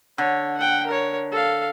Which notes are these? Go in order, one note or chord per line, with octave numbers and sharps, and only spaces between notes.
D3 C#5
F#5 G5
A#4 C#5
A4 F5